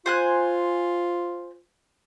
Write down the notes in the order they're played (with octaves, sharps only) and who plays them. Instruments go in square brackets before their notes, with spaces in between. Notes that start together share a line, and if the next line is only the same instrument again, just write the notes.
[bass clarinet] F4 [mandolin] C5 G#5 F#6